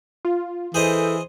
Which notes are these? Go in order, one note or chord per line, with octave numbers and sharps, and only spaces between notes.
F4
E3 G#4 A4 C5 D#5 G6